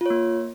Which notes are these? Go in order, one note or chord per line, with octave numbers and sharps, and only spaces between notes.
A#3 F4 C#5